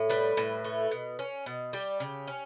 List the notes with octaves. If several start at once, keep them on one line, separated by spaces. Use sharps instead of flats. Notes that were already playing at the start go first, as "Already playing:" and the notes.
Already playing: A2
G3 B4
A2
A3
B2
C#4
B2
G3 G4
C#3
C#4